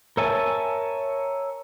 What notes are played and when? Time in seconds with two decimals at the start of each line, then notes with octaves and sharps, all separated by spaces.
0.17 A#4 C#5 E5 G#5 A5